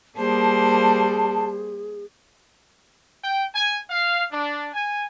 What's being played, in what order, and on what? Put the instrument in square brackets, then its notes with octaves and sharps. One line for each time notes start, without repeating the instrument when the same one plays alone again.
[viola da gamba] G3 A#3 C5 [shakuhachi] G#4 [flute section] A5
[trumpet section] G5
G#5
F5
D4
G#5